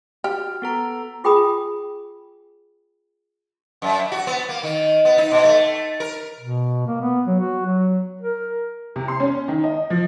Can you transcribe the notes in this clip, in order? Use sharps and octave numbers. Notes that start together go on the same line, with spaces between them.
F#4 G4 F6
B3 A4 A#5
F4 G#4 G5 G#5 B5 D#6
F#2
F#4
B3
A#3
D#3
B3
D#4
B2
A3
A#4
B2
A#3
B3
F#3
F#4
F#3
A#4
C3
C6
C#4
D#3
D#5
F3